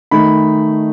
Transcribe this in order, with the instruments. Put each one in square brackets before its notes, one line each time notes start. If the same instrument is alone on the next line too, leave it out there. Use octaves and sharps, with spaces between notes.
[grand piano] D#3 A3 D#4 B5